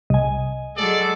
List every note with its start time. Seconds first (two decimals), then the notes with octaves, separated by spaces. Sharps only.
0.10 C2 D#5 G#5
0.77 F#3 G#3 A4 D5